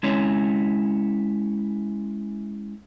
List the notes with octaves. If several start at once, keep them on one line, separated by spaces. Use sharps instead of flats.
G#3 C#4 E4 C#5